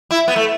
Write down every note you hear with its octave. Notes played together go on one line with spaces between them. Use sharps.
E4
B3
A3